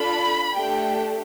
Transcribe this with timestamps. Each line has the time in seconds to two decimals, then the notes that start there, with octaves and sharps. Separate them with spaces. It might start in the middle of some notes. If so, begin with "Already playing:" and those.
Already playing: D4 F4 A4 B5
0.54 A3 D4 G4 G5